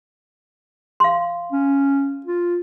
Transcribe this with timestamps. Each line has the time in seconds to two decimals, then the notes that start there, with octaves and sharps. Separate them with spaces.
1.00 F5 C6
1.52 C#4
2.26 F4